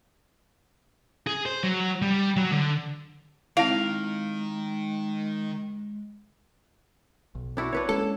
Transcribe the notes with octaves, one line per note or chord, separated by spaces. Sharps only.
G#4
C5
F#3
G3
F#3
D3
D#3 G#3 C4 E4 F5
B1
D4 E4 F#4
D4 B4 C#5
G#3 A#3 C#4 A4